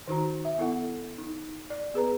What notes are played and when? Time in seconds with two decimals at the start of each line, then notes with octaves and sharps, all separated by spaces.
0.08 D#3 D#4 F#4 A#5
0.45 E5
0.58 B3 E4 A4 F#5
1.18 D#4
1.70 D5
1.94 B3 G#4 B4 A#5